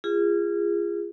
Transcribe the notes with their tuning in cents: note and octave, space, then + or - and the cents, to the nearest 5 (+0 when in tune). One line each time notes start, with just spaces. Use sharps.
F4 -25 G#4 -25